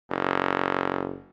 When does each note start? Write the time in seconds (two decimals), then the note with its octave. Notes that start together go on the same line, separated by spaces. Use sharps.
0.10 F#1